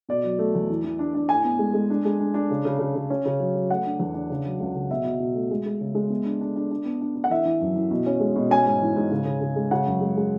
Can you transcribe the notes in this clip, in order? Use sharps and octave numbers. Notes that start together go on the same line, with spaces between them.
B2 D5
F#3
A3
E2
E3
E3
D4
D4
A2 G#5
B3
G#3
G#3
D4
G#3
D4
D4
C#3
C#3
C#3
C#3
C#4
C#3
F#3
F#3
A3 F#5
D4
E2
D4
C#3
F#3
C#2
C#3
B2 E5
B2
B2
A3
G#3
G#3
C#3
G#3
B3
D4
D4
D4
D4
B3
D4
D4
F#5
E3 E5
E3
F#2
E3
B2
C#4
G#3
B2
C#4 G#5
G#2
E3
G#2
C#3
C#3
C#3
G#3
C#3 F#5
F#2
G#3
G#3